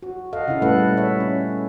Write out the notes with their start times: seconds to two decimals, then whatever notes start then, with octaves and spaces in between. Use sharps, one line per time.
0.03 F#4
0.33 A4 D#5 F5 F#5
0.48 C#3 E4
0.62 A#2 G3 A3 A4 B4 F#5
0.97 C#5 E5
1.20 C#4